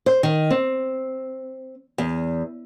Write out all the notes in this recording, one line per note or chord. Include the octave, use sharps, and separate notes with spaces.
C5
D#3
C4
E2